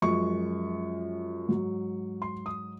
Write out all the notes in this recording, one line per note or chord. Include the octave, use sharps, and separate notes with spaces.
F#2 F3 G#3 C#6
G#2 F#3
C6
D#6